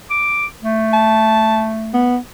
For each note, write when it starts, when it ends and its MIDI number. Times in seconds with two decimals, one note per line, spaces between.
0.11 0.46 86
0.62 2.14 57
0.93 1.68 81
1.94 2.17 59